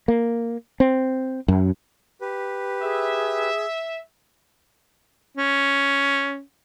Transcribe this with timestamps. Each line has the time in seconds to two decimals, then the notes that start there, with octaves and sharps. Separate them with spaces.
0.08 A#3
0.80 C4
1.48 F#2
2.21 G4 B4
2.82 G#4 E5
5.38 C#4